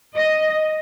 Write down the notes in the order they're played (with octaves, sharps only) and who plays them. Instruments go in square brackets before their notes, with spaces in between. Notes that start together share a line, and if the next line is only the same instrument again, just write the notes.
[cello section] D#5